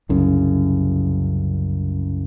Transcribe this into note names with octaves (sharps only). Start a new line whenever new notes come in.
C2 F#2 C#3